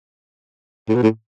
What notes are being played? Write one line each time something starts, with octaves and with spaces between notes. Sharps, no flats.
A2
B2
A2